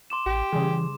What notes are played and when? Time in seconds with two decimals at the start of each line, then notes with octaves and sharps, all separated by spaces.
0.10 C6 D6 E7
0.26 A1 G4
0.53 C#3 E3 G3 G#4